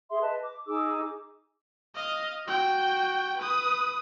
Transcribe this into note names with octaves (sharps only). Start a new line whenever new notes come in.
G#4 E5 C6
B4 D#5 A5
D6
D#4 G#4 D6 E6
D#5 F5
F#4 G5
B4 D#6